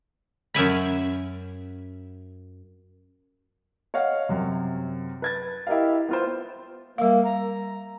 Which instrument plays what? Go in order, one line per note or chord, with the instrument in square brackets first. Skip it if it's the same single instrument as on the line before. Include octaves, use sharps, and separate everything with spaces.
[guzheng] F#2 E5 G#5 B5
[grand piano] C#5 D#5 F5 F#5
F#2 C3
B4 G#6 A6
E4 G4 A#4 D#5 F5
B3 F4 C5
[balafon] G3 F5 [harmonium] A#3
[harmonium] A#5